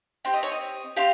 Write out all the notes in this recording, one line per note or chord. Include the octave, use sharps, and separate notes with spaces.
C4 G4 G5
D#5
C#5
D#5
C4 G4 F5